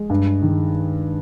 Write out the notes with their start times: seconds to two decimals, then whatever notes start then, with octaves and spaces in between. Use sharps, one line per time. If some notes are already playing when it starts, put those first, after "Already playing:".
Already playing: G#3
0.10 G2
0.42 D#3